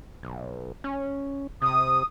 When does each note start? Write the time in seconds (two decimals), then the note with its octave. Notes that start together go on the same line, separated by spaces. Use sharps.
0.23 B1
0.84 C#4
1.62 C3 D#6